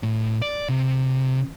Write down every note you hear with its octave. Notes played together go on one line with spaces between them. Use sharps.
A2
D5
C3